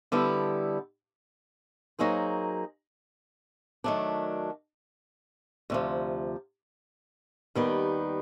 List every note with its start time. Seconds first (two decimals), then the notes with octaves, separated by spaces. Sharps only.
0.12 D3 G3 B3 E4 A4
1.99 F#3 A#3 D#4 G#4 C5
3.84 D#3 F#3 A3 D4
5.70 D2 C3 F3
7.55 D#2 D#3 G3 B3